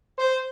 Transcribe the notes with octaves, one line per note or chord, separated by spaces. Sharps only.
C5